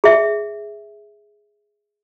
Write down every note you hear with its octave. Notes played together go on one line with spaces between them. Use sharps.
G#4 E5